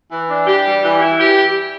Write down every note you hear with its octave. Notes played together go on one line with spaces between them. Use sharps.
E3
D4
G4
G3
E3
E4
G4